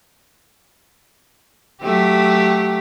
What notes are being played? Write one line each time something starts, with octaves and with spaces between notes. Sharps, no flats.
F#3 A3 G4